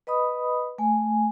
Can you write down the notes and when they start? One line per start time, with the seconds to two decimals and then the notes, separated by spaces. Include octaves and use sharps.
0.07 B4 D#5 B5 D#6
0.78 A3 G#5